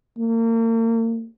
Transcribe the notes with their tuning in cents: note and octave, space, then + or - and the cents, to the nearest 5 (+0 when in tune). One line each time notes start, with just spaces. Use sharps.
A#3 -35